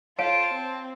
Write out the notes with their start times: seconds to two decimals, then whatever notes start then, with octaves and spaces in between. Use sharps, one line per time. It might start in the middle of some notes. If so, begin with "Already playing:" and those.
0.19 F4 C5 C#5 F5 G5 A5 D7
0.53 C4